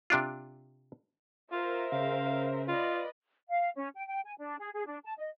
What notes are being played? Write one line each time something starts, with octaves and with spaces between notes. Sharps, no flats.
C3 D4 F4
F4 A#4 C5 E5
C#3 F5
F4 B4 D5 D#5
F5
C#4
G5
G5
G#5
D4
G#4
G#4
D4
A5
D#5